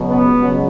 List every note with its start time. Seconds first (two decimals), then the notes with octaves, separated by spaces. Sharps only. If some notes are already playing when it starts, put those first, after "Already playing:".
Already playing: C#2 B2 F#3
0.10 B3
0.38 C#2 B2 F#3